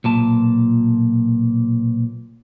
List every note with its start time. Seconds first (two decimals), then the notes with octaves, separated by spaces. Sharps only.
0.04 B1 A#2 A5